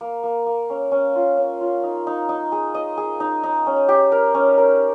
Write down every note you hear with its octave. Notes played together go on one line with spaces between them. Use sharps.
A#3
A#3
A#3
C#4
C#4
F4
C#4
F4
D#4
D#4
D#4
G#4
D#5
G#4
D#4
D#4
C#4
G4
A#4
C#4
A#4